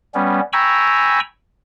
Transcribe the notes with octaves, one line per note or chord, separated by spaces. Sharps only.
G3 B3 C#4
G5 G#5 A#5 B5 C#6 E6